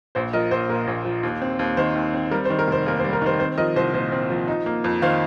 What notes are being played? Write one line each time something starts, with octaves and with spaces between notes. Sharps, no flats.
A#1 C5
F3 A#4 D#5
A#1 C5
A#2 A#4
A#1
F3
D#2
C4
D#2
D#3 C5
D#2
C4
G3 A#4
C5
D#3
A#4
F1 C5
D#2 A#4
C5
G3
A#4
D#3 C5
C4 C5
F3 A#4 D#5
C2 C5
A#2 C5
C4
F3
D#4
A#3
F2
D#3 C5 F5